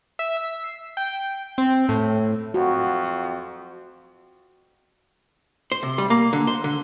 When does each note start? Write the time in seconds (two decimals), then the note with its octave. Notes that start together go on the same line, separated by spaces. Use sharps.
0.19 E5
0.37 E6
0.64 C7
0.97 G5
1.58 C4
1.89 A2
2.54 F2 F#4
5.72 C5
5.83 C3
5.98 G3
6.10 A#3
6.33 D3
6.47 C5
6.64 D3